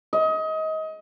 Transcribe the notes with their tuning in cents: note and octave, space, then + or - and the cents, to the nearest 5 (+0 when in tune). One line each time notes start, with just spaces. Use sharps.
D#5 +25